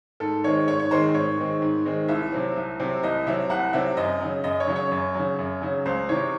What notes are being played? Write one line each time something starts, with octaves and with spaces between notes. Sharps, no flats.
G#2 A4
D#3 G#3 C4 C#5
G#2 C#5
C#5
D#3 G#3 C4 C5
G#2 C#5
D#3 G#3 C4
G#2
D#3 G#3 C4
C2 E5
C3 F#3 C4
C2
C3 F#3 C4
C2 D#5
C3 F#3 C4 E5
C2 F#5
C3 F#3 C4 E5
F#2 D#5
C#3 F#3
F#2 D#5
C#5
C#3 F#3
C#5
F#2
C#3 F#3
F#2
C#3 F#3
C#2 C5
C3 E3 C#5